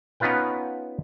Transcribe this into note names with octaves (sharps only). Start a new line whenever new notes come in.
B3 C#4 D#4 F4 B4 G5